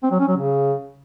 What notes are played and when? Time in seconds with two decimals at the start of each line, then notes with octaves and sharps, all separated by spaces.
0.03 C4
0.11 F#3
0.20 C#4
0.28 F#3
0.36 C#3